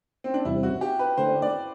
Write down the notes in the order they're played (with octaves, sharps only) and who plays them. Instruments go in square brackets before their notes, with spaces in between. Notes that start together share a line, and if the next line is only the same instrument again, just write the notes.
[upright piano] C4
D4
[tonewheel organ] E2 C3 G3 C4 [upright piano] E4
[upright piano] F#4
G4
B4
[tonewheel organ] D3 A3 D4 [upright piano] C5
[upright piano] D5